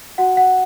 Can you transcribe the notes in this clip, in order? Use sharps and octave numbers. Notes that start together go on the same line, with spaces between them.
F#4 F#5
F#5